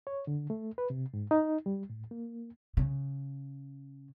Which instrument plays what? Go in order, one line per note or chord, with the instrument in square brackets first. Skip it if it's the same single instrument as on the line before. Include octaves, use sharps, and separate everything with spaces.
[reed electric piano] C#5
D3
A3
B4
C3
G#2
D#4
G3
A2
A#3
[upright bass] C#3